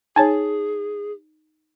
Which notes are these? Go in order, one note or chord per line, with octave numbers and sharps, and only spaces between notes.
D#4 G#4 C#5 G#5 A5